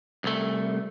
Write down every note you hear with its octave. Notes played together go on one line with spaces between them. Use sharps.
C2 A3